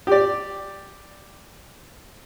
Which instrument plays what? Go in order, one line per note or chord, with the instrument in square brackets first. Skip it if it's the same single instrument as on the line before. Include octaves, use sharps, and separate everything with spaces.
[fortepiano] G4 D5